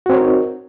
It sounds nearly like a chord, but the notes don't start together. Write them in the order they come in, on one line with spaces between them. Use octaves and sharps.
F#4 C4 C#5 A#4 D#4